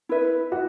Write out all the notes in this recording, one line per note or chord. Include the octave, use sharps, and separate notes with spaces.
E4 B4 E5
F#4